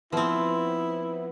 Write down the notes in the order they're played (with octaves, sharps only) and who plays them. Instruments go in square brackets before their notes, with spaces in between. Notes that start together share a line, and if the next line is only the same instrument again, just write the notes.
[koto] F3 C4 [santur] B3 B4 [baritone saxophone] E4